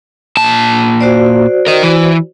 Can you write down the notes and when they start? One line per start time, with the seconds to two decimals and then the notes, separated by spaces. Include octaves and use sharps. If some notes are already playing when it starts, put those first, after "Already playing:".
0.37 A#2 A5
1.01 F#4 C5 D5
1.67 A#4 D#5
1.83 E3